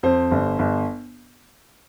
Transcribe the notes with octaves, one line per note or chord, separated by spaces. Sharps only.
F2 C5
G1
G1